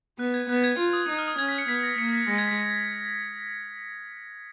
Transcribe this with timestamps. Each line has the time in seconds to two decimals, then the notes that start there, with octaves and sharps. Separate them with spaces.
0.19 B3 F#6
0.34 G#6
0.49 B3 F#6
0.64 G#6
0.79 F4
0.93 D#6
1.08 D#4 D#6
1.19 F6
1.28 D#6
1.38 C#4 G#6
1.48 B6
1.58 C#7
1.68 B3 B6
1.83 A#6
1.98 A#3 C#7
2.13 B6
2.28 G#3 A#6
2.38 G#6
2.48 B6